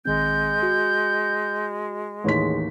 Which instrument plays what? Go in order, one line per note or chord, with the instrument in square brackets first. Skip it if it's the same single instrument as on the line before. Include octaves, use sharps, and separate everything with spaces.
[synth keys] A#1 D#3 C4 [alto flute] G#3 [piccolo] G6
[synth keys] F#4
[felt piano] A1 D#2 B6 [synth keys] G#4 C#5 C6